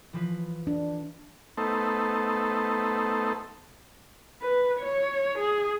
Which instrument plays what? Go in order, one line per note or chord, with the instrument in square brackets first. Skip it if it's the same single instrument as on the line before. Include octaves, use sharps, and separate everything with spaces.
[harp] E3 F3 B4
[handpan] D4
[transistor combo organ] A3 B3 D#4 A4 C5
[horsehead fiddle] B4
C#5
G#4